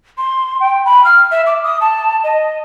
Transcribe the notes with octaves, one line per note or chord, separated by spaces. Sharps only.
C6
G5
B5
F6
E5
D6
D#6
A5
D#5